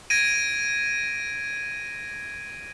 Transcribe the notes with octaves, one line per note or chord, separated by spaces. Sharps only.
G#6 A#6 D7 D#7